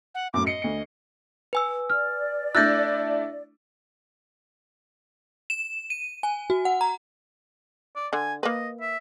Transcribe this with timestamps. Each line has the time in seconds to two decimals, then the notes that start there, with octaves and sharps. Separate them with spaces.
0.15 F#5
0.34 F#2 A2 D6
0.47 D#5 C7 C#7
0.62 D2 C#7
1.53 B4 G#5 E6
1.90 D5 F6
2.55 A3 D4 E4 E6 F#6 G6 A6 A#6
5.50 E7
5.90 D#7
6.23 G#5
6.50 F#4
6.65 F#5
6.81 A#5
7.95 D5
8.13 D3 G#5
8.43 A#3 B4 D#5
8.81 E5